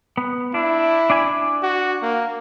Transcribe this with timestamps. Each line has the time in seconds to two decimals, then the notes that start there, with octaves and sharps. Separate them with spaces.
0.17 B3
0.54 D4 E4
1.10 D4 D5 G#5
1.62 F#4
2.02 A#3